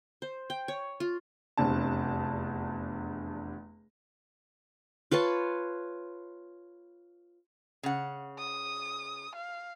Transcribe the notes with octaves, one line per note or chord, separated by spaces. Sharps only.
C5
G5
C#5
F4
F1 E2 C3 D4 A5
F4 B4 C#5 A5
C#3 F#5
D#6
F5